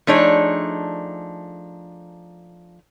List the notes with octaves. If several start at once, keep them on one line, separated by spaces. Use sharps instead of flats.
F3 A3 D4 D#4 G#4 C#5